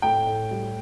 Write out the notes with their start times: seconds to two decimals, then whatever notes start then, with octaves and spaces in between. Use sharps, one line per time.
0.02 A2 G5
0.27 A2
0.51 G3